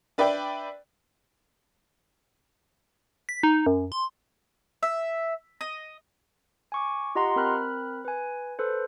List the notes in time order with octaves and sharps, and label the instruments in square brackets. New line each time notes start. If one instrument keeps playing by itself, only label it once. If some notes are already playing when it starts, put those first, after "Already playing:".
[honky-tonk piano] D4 B4 D5 E5 G5
[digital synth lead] B6
D#4
F#2
C6
[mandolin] E5
D#5
[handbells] G#5 C#6 D6
F4 G4 D#5 F#5 A#5 C6
C4 A#4 B5 F6 F#6
B4 G#5
A4 B4 C5